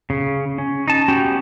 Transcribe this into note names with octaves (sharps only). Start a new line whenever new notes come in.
C#3
C#4
D#4 A5
B3 C#4 F#4 G4 G5